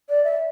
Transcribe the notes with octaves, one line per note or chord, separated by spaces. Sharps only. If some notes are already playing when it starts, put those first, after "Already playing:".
D5
E5